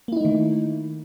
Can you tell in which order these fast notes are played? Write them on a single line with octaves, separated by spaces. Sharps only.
A#3 E4 D#4 A3 D#3